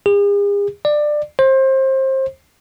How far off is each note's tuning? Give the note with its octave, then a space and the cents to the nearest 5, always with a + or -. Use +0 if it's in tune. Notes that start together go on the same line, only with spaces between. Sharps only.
G#4 -45
D5 +20
C5 +25